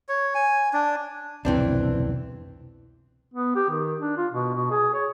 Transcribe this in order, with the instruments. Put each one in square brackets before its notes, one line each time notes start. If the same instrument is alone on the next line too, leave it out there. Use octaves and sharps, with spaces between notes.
[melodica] C#5
G#5
D4
[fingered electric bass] C2 F2 B2 [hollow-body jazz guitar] E3 C4 D4
[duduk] B3
G4
D#3
D4
F4
B2
B2
G#4
C#5